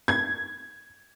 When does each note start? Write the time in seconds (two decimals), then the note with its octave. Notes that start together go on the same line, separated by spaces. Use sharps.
0.08 G#6